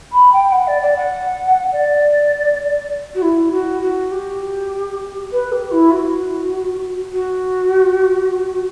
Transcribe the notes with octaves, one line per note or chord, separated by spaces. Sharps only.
B5
G5
F#5
D5
D5
F#5
D5
F#4
E4
F#4
F#4
G4
B4
G4
E4
F#4
F#4